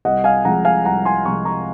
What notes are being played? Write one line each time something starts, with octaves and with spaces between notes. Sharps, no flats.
C2 D#5 F#5
F5 G#5
C3 F3 G#3 F#5 A#5
F5 G#5
C2 F#5 A#5
G#5 C6
C3 F3 G#3 A#5 C#6
A#5 C#6